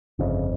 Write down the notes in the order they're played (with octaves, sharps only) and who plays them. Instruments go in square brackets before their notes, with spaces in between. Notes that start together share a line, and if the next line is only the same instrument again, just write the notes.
[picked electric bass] G1 F2 C#3